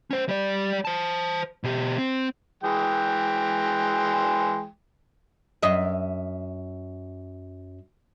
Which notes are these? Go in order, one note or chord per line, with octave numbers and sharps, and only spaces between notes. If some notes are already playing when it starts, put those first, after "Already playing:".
C#4 C5
G3 D5
C5 A5
B2 G4
C4
E3 G#3 G5
F#2 D#5 E5